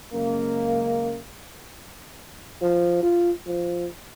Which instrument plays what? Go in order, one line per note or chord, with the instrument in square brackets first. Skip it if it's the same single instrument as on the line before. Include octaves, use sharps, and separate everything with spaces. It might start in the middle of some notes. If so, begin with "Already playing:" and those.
[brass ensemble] F#2 C#3 G#3 A#3
[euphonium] F3
F4
F3